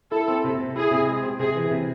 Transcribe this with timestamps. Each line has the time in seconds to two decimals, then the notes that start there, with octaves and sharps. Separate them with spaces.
0.12 E4 A4
0.28 C4
0.44 C3
0.60 C3
0.76 E4 G#4
0.91 C3
1.07 G#3
1.23 C4
1.39 C3 G#4
1.56 E3
1.71 C3